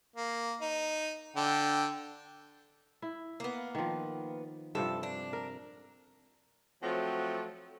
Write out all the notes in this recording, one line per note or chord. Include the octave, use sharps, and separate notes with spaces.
A#3
D#4
D3 G5
E4
A#3 B3
D#3 F3
G2 C3 F3 A4
D4
A#4
F3 F#3 A3 C4 F#4